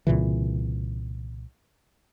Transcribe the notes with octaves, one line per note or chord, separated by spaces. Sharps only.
C2 A#2 C#3 E3